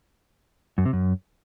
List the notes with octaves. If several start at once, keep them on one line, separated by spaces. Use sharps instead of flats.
F#2
C3
F#2